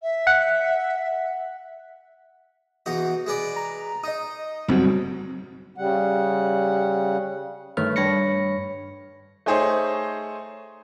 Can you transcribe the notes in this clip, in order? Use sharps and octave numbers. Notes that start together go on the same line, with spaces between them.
E5
F#5
E2 D#4 F#4
G#3 B4 D5
A#5
D#4 D#5 D#6
F#1 B1 F#2 G3 C4 F#4
C#3 G3 F#5
G2 D#3 A3 B4 C#5 F6
G2 C#5 B5 A#6 C#7
A3 D#4 G#4 C5 C#5 D#5